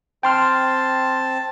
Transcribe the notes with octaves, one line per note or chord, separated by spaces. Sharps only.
C4 G5 A5 C6 F6